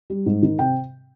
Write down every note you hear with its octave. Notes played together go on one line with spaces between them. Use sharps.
G3
G#2
D#3
C3 G5